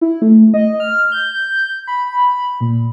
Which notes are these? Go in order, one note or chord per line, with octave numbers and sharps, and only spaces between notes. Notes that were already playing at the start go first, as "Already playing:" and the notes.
E4
A3
D#5
F6
G6
B5
A#2